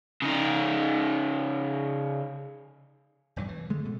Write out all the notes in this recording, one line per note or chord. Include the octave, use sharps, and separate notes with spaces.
C#3 D#4
E1 G2 F#3
E3
D3 G#3 A3
B2 A3